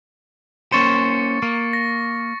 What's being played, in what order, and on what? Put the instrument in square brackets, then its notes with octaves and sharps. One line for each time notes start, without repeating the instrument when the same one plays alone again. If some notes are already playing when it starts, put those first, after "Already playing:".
[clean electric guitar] A#3 C#4 C5 [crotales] C#6 A6 C#7
[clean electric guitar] A#3 [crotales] C#6
[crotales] A#6